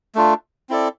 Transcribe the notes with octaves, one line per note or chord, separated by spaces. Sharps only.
A3 D4 F4
C4 E4 A4 D5